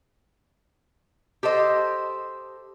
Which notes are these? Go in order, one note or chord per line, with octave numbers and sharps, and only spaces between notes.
G4 A4 C5 D#5